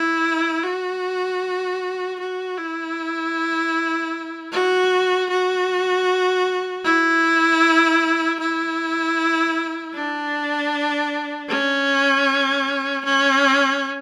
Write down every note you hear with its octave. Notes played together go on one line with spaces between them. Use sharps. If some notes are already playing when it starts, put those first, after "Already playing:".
Already playing: E4
F#4
F#4
E4
F#4
F#4
E4
E4
D4
C#4
C#4